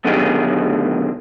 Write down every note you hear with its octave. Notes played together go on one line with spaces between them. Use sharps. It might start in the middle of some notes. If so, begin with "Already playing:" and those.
F#2 B2 D3 D#3 G4 G#4